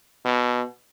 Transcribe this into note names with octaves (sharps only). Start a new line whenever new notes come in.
B2